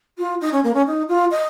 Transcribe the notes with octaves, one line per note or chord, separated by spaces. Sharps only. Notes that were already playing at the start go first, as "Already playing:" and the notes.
F4
D#4
C#4
A#3
C#4
D#4
F4
D#5